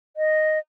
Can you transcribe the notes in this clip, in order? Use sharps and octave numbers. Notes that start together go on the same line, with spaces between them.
D#5